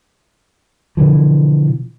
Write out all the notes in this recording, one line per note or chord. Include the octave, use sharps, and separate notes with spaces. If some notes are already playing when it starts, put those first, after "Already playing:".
B2 D3 E3 F3